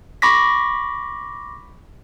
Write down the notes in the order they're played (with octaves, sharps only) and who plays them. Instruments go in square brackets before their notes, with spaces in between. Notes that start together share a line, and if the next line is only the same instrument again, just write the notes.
[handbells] B5 C#6 D6 A#6 B6